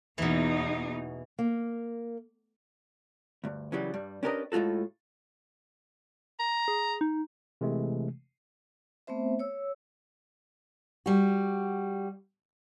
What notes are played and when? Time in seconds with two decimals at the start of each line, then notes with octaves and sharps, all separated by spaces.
0.18 E2 B2 E3 A#3 D#4
1.39 A#3
3.44 D2 G2
3.72 C#3 E3 F#3 G3
3.94 G2 G3
4.23 C#4 D4 G4 A#4 B4 D#5
4.52 A2 G#3 F4 F#4 A4
6.40 A#5
6.68 G#4
7.01 D#4
7.61 C3 E3 G#3 A3
9.07 A3 B3 C4 C5 E5
9.39 C#5 E6
11.06 G3 F#4